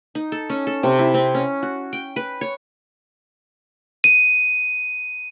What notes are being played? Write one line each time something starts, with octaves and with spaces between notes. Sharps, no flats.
D#4
A4
C#4
A4
C3
E4
C4
C#4
F#4
G5
B4
C#5
D#7